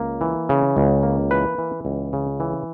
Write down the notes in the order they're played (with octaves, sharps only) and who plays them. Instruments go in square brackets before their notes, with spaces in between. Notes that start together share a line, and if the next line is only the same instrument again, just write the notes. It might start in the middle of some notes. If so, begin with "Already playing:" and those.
Already playing: [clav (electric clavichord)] C#2 A#3
E3
C#3
C#2
A#3
E3 B4
E3
C#2
C#3
E3